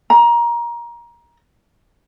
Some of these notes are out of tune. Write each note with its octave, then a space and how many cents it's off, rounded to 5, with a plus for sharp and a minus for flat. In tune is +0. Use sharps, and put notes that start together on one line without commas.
A#5 +20